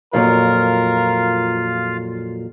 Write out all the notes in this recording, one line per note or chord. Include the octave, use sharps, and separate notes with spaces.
F2 A#2 F#3 F4 A#4 F5